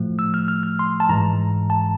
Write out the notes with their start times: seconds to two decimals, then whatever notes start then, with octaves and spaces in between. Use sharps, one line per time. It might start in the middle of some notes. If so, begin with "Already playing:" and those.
Already playing: A2 F3 A3
0.19 E6
0.34 F6
0.48 F6
0.63 F6
0.79 C6
1.00 A5
1.09 G#2 E3 G#3 A#5
1.70 A5